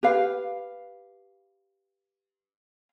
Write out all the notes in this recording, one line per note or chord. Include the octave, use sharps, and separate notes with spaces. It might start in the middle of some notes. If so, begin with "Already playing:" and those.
G4 B4 F5